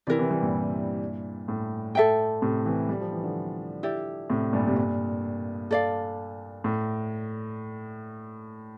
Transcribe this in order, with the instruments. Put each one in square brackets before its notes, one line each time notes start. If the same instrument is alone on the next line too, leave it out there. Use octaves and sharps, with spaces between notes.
[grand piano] C3 E3 [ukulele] E4 A#4 D5
[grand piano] C3 E3
E3 G3
G2 A#2
A2
[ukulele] A4 E5 G5
[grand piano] A2 C3
C3 E3
G3
F3
E3
D3 F3
[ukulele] E4 G4 D5
[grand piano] A2 C3
G2 A#2
C3
G2 A#2
[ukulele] A4 D5 F5
[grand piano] A2